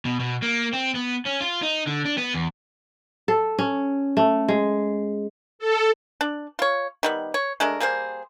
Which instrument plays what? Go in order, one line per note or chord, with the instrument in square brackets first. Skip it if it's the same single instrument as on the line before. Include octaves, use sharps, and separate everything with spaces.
[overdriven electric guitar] B2
B2
A#3
C4
B3
C#4
F4
D#4
D3
D4
B3
E2
[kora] A4
C#4
A3
G#3
[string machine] A4
[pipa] D4
F4 C#5
D#3 G3 B3
C#5
G#3 A3 D4 A#4
G3 A#3 G#4 C5